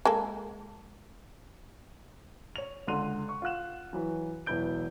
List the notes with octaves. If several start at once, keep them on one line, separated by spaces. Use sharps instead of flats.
G#3 A#3 A4
C#5 F7
C#2 D3 C6 F#6 D#7 F7
C#6
F4 F#5 F#6 E7
E3 F#3 B4
E1 F#3 E4 B4 G6 D7